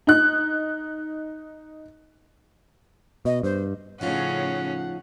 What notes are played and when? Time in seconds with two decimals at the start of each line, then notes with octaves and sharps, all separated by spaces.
0.07 D#4 F#6
3.25 B2 D#5
3.43 G2 C5
4.01 A2 C#3 F3 C#4 D#4 F4 F#5